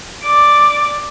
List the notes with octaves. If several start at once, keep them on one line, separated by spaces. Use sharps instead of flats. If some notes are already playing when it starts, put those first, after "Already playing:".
D5 D6